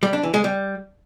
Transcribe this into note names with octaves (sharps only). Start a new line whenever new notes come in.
G3
D4
E3
G#3
G3